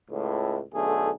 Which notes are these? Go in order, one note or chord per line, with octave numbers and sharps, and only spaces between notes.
C#2 A2
B1 D3 A3 G#4